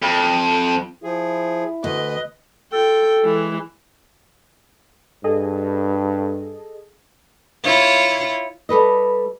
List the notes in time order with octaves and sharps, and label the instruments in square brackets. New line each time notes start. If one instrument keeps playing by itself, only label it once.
[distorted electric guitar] F2
[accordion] F3 G#4 [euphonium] E4
[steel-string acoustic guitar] D2 [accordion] B4 [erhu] D#5
[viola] F4 G5 [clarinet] A4
[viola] E3 G#3
[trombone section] G2 [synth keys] G#4 A4 D#5
[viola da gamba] E4 F4 C#5
[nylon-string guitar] G3 A4 B4 D#5